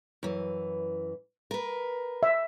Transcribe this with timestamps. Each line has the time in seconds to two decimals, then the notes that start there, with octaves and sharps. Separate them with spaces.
0.23 F#2 E3
1.51 A#4 B4
2.23 E5